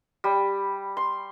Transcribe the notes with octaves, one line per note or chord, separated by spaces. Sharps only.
G3
C6